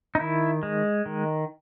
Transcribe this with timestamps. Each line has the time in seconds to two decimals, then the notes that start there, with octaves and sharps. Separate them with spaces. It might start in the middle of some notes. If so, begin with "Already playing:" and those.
0.15 D#4
0.20 D#3 E4
0.63 G#3
1.06 D#3